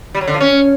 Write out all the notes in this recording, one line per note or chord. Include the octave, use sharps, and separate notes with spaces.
G3
F#3
D3
F3
C#4